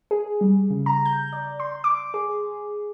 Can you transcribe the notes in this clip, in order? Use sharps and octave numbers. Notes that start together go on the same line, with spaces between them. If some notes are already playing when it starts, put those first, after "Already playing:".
G#4
G3
C#3
A#5
G6
D5
C6
D6
G#4